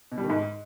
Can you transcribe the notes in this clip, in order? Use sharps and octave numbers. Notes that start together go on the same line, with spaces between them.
B2
G3
D#3
G#2